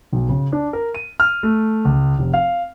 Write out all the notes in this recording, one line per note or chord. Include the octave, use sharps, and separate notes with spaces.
B1
C#3
D4
A#4
D#7
F6
A3
C#2
F1
F5